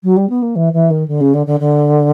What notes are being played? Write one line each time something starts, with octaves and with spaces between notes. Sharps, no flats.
F#3
G3
B3
A#3
E3
E3
D#3
D3
C#3
D3
D3
D3